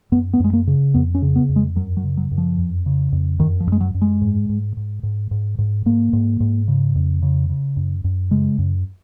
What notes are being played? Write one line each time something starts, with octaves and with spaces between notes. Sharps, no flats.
F#2 B3
B3
F#2 G#3
A#3
C#3
F2 B3
C#4
C#3
B3
F2
G#3
F#2 F#3
F#3
C#3
F#3
F#2
F3
F2
C#3
F2
F#2 D#3
F3
F#2
G#3
F#3
F#2
G#3
G#2
G#2
G#2
G#2
G#2
G#2
G#2 A#3
G#2
G#2
C#3
F2
C#3
C#3
F#2
F#2
C#3 G#3
F#2